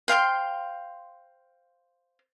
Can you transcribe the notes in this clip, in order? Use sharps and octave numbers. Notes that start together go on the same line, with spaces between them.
C5 F5 G5 C6